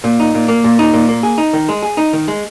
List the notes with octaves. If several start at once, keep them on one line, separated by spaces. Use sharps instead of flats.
A#2
D#4
A#2
A#3
A#2
D#4
A#2
A#3
G#4
D#4
D#3
G#3
G#4
D#4
D#3
G#3